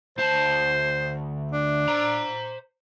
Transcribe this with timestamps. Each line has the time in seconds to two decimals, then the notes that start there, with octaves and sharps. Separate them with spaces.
0.18 D2 C5 A5
1.52 D4
1.88 C5 A#5